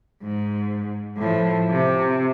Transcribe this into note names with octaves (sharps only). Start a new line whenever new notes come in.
G#2
A2 F3
C3